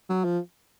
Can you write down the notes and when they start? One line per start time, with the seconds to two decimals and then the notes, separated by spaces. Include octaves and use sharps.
0.09 F#3
0.24 F3